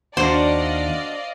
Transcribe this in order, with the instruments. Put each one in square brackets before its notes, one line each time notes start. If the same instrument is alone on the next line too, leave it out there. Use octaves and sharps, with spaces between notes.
[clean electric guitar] D#2 [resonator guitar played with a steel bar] D4 F#4 [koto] C5 [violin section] D5 D#5 F5